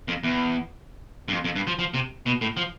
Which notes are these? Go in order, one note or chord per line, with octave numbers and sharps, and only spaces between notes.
F2
E2
G2
F2
F2
G2
F3
F3
C3
B2
A2
F3